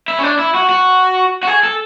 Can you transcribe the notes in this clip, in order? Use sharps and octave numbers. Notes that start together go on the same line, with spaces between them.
E4
C#4
D4
E4
F#4
F#4
F#4
G#4
A4